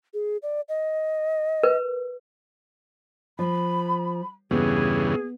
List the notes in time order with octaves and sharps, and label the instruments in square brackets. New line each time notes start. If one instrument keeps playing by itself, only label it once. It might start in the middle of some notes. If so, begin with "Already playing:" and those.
[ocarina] G#4
D5
D#5
[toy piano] A#4 B4
[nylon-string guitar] F3 [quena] B5
[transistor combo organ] E2 G2 C#3 [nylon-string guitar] B3 [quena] G#4